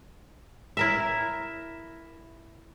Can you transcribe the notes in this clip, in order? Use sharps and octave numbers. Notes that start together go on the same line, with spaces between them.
E4 A#4 E5